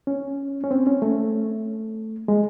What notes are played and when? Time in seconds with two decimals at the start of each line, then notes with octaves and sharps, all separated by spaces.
0.07 C#4
0.64 C#4
0.71 C4
0.87 C#4
1.02 A3
2.28 G#3